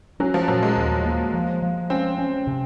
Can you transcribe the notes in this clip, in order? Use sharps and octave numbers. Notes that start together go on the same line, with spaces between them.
F#3 C#4
F3
A#2 F#3
G#3
D#2
A#3
F3
F3
C4 C#4
C#4
C3